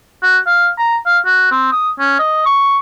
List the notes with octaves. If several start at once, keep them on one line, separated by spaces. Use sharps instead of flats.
F#4
F5
A#5
F5
F#4
C4
D#6
C#4
D#5
C#6